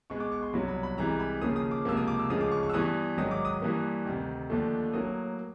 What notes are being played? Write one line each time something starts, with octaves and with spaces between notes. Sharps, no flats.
B2 G#3 B3 C#6
D6
C#6
C6
C2 B2 F#3 B5
B5
B5
C2 C3 E3 G#3 A#5
B5
D#2 C#3 F3 A#3 D#6
D#6
D6
C#2 C3 F3 A#3 E6
D#6
D6
E6
D2 C#3 F3 G#3 D#6
D6
C#6
C#6
E6
G2 E3 G3 B3 D#6
G#2 D#3 F#3 D#6
D6
D#6
G2 E3 G3 A#3
D2 C3 D#3
D#2 D3 F3 A3
A2 F#3 A#3 D#6